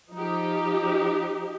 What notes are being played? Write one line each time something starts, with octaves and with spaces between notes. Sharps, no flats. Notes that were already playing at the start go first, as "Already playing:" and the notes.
F3 D#4 G4